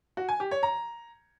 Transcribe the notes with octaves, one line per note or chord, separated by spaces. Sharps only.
F#4
G#5
G4
C#5
A#5